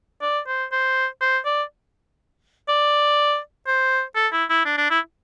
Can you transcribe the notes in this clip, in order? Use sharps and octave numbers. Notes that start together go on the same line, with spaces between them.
D5
C5
C5
C5
D5
D5
C5
A4
E4
E4
D4
D4
E4